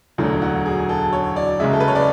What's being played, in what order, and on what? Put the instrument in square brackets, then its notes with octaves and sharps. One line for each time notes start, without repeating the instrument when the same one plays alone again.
[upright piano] E1 D2 D3 F#3 A3 F#4
F#4
G#4
A4
C#5
D5
F#1 F#2 C#3 G#3 E5
A4
B4
C#5
D5